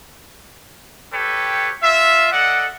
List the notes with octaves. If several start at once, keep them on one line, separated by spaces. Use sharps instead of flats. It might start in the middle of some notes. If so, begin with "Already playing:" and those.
G4 A4 B4 C#5 G5
F4 E5
A4 D5 D#5 F#5